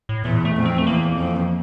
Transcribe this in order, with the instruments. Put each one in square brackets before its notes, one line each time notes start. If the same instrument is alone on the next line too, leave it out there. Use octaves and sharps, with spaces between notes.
[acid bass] A2
[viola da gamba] E2 [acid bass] A#2
[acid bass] A3
[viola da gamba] F2
[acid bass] C4
A3
[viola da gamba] E2 [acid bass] A#3
[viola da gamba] F2